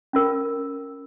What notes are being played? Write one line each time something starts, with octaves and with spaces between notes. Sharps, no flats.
C#4 F4 A#4